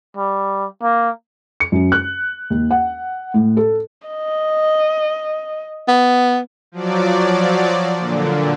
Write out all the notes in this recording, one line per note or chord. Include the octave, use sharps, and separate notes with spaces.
G3
A#3
C#7
F#2
F#6
D#2
F#5
A2
A4
D#5
B3
F3 F#3 D5
A#2 D3